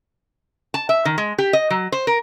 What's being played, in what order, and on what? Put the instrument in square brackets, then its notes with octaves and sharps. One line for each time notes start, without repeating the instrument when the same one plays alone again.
[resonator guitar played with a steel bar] A5
E5
D#3
G#3
G4
D#5
F#3
C5
A#4